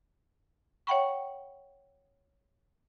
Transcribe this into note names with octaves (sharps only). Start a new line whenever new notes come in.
C#5 E5 F#5 G5 B5 C#6